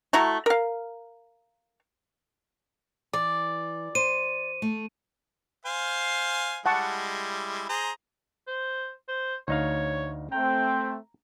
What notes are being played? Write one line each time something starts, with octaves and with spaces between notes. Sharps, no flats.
A3 E4 F#4 A#5
A#4 F5
E3 D5
C5 D#7
A3
C5 F5 G#5
G3 G#3 E4 F#5 A5 C#6
G#4 C5 A#5
C5
C5
D2 D#4 C#5 F5
A3 C4 G5 A#5